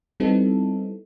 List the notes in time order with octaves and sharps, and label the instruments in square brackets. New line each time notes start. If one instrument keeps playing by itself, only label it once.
[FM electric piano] G3 B3 C4 D#4 E4 A4